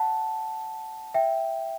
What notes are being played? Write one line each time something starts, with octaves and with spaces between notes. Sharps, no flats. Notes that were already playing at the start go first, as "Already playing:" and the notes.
Already playing: F#5 A5
E5 G5